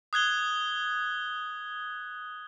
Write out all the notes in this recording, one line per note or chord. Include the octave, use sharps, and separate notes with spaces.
D#6 F#6 G#6 G7